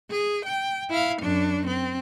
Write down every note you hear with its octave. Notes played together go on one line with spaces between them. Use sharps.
G#4
G5
E4 F5
F#2 D4
C4